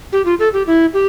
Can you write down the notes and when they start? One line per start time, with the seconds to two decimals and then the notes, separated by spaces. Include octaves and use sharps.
0.12 G4
0.25 F4
0.39 A4
0.53 G4
0.67 E4
0.94 G4